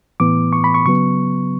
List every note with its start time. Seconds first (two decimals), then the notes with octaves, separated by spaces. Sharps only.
0.20 A2 E3 B3 D6
0.53 C#6
0.64 B5
0.75 C#6
0.86 C#3 F#3 B3 C#6